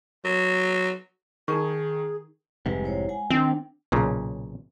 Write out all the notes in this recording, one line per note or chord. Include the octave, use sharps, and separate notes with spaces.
F#3
D#3 D#4 G#4 A#4 C#6
F1 G#2 C3 G3 G#3 B4
E4 C5 C#5
G#3 F#5 G#5
D#3 E3 C4 D4
B1 A#2 C#3